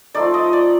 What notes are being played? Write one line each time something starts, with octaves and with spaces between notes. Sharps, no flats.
F3 A3 D#4 D5
D#5
D5